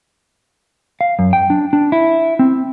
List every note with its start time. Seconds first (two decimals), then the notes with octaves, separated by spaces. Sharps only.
1.01 F5
1.19 F#2
1.33 G5
1.50 D4
1.73 D4
1.92 E4
2.39 C4